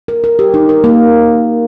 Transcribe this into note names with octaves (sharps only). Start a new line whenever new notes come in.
A#4
A#4
G4
D#4
A#4
A#3